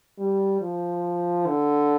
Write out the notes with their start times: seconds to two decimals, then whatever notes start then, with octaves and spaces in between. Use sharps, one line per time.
0.19 G3
0.61 F3
1.47 D3